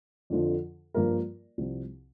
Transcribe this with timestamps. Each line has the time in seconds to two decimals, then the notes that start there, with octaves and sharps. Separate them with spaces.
0.30 F2 D3 F3
0.94 G2 F3 A#3 F4 A#4
1.58 C2 C3 F3 C4